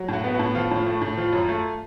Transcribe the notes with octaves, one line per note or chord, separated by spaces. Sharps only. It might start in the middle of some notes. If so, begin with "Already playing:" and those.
Already playing: F#3
A2 F#4
B3
F#4
A2
F3 F4
A2 F4
A3
A2
F3 F4
F#2
A3